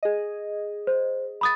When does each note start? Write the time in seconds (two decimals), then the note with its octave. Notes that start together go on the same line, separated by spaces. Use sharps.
0.03 G#4 D#5
0.87 C5
1.41 B5 D#6 A6